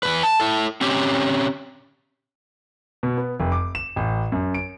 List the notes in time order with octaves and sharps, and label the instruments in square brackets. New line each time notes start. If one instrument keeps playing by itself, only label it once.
[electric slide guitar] E2 G2 B4
A5
E4 A4
C4 C#4 G4
[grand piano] B2
B3
F1
D6
E7
A1
F#2
D7